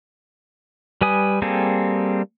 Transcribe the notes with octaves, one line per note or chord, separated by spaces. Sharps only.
G3 B4 G#5 D#6
G3 A#3 C4 G#4 A4